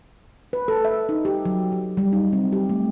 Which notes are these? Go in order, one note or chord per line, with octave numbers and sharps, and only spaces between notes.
B4
A4
E5
D#4
G4
F#3
G4
G3
D#4
C4
G4
A3